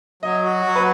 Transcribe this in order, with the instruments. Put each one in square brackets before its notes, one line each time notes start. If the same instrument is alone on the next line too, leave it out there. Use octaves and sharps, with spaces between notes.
[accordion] F#3 [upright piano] D#5
[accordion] F#4
F#3
[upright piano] B4